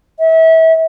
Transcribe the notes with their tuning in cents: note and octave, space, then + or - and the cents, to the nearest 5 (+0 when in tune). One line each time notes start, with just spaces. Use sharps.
E5 -30